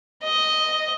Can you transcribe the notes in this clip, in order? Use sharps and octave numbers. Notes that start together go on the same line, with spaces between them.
D#5